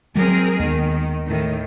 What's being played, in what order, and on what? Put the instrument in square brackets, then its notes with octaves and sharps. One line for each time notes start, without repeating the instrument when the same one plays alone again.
[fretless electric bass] F#3 G#3 [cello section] C4 G#4 A#4
[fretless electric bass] D#2 G#3 B3 [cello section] D#3
[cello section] A2 D#3